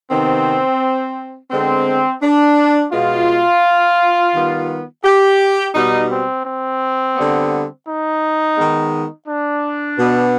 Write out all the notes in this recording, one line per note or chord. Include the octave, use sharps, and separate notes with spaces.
C3 D#3 B3 C4
D3 G#3 B3 C4
D4
B2 G#3 B3 F4
D#3 G3 B3
G4
B2 G3 B3 D#4
C4
C4
D3 G3 B3
D#4
D#3 G#3 B3
D4
B2 B3